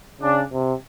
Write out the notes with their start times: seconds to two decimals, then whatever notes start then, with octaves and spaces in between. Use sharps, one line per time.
0.21 C#3 D4
0.52 C3